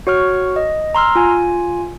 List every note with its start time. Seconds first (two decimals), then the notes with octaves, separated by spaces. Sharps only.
0.07 F#4 C#5 C#6 F6
0.56 D#5
0.95 A#5 C6 E6 F6
1.15 F4 G#5